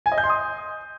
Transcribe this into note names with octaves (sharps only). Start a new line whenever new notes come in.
G#5
D#5
G6
C6
D#6